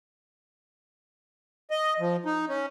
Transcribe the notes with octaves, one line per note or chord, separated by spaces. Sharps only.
D#5
F3
D#4
C#4